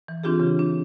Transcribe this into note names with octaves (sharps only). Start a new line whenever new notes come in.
E3
E3 C4 D4 F4 G4 G#4
C#3
D4